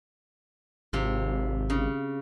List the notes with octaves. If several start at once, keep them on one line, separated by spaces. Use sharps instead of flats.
G#1 C3 F4
C#3